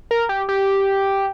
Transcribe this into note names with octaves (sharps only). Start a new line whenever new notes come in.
A#4
G4
G4